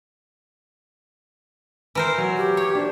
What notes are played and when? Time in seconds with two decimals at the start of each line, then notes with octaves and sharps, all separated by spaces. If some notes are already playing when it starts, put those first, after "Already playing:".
1.95 E3 A#4 C5
2.18 F#3
2.37 G4
2.57 C#5
2.75 D4 C5